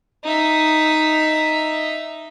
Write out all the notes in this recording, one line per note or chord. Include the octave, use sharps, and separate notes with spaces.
D#4 E5